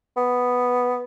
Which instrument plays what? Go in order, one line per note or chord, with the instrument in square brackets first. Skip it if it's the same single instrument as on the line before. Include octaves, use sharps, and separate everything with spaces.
[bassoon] B3